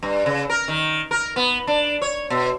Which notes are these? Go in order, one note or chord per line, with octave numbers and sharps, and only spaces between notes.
G2
C#3
A#4
D#3
A#4
B3
D4
C#5
B2